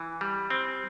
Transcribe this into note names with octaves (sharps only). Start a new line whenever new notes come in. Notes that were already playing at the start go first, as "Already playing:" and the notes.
Already playing: E3
G3
C4